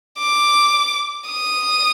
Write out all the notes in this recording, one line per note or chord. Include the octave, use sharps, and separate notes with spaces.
D6
D#6